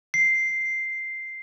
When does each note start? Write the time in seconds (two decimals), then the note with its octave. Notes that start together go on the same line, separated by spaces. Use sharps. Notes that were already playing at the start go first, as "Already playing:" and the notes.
0.14 C7